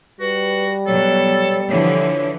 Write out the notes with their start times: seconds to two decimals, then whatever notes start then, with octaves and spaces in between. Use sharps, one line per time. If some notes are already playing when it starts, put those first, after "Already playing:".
0.20 G3 F#4 B4
0.87 B2 F#3 A4 C#5
1.71 D3 E3 F3 C#5